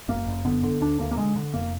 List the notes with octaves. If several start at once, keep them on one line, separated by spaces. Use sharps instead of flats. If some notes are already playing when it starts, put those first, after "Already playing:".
F#1 A#3
F#1
D3 B3
D3
D2 D4
D2 A#3
A#3
D3 G#3
D3
F1 A#3